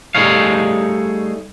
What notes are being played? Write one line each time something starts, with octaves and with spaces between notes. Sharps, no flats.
G3 A3 D#4 G#4 C#5 F5